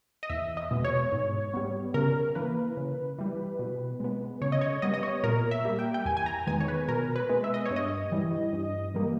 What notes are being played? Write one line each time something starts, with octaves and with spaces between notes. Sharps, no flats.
D#5
E2 E5
D#5
B2 G#3 B3
C#5
G#2
G3 B3
C#3 A#4
E3 A#3 B4
C#3
E3 G3
B2
G#3 B3
C#3 C#5
D#5
C#5
G3 B3 D#5
D#5
C#5
A#2 A#4
E5
G3 A#3
G5
G5
E2 G#5
G#5
A#5
D#3 G#3 B3 G#5
C#5
B4
B2 A#4
B4
G#3 B3
E5
D#5
G2 C#5
D#5
E3 G3
G2
E3 G3 A#3